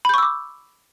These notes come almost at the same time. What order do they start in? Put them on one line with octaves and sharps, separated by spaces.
B5 G6 C#6 E6 D6